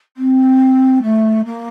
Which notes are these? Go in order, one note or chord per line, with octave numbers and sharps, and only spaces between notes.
C4
A3
A#3